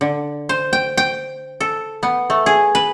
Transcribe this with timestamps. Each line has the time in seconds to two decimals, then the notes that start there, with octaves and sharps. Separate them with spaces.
0.01 D3
0.49 C5
0.73 G5
0.97 G5
1.60 A4
2.03 B3
2.30 A3
2.46 G#4
2.75 B4